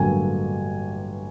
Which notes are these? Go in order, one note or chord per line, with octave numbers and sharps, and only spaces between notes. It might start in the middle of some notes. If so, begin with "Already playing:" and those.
Already playing: A1 G2 D3 F#3 A#3 G#5